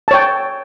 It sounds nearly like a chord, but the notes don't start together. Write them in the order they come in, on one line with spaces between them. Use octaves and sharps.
A5 C#5 G5